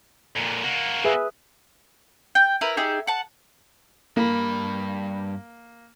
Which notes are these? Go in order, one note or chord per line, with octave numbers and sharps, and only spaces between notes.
F2 A#2
A#3 F#4
G#4 B4 E5
G5
E4 A#4 B4
D#4 G4 G#4 E5
F#5 A5
G2 A#3 B5